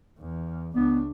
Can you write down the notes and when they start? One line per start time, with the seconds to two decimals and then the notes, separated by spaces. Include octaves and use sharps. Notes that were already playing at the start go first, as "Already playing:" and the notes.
0.19 E2
0.75 C#2 B3 D4